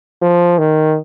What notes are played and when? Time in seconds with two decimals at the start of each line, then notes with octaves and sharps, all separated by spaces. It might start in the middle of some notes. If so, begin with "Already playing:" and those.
0.22 F3
0.58 D#3